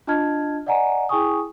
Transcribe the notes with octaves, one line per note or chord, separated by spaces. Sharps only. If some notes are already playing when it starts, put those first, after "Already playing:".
D4 F4 D#5 A5 F6 G#6
D5 D#5 F#5 G#5 A#5
E4 G#4 G5 G#5 C#6 D#6